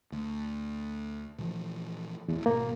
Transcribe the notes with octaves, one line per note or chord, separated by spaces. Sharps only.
D2
A#2 E3 F3
D1 E2
G#1 B2 A#3